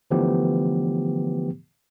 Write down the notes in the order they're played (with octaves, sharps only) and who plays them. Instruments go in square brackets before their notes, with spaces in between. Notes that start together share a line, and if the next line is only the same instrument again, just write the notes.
[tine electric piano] D3 E3 F3 A3 B3 G4